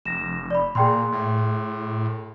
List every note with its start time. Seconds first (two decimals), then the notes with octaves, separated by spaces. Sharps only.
0.05 F1 A#6 E7
0.51 D5 B5
0.75 A#2 G#4 G5 C6
1.12 A2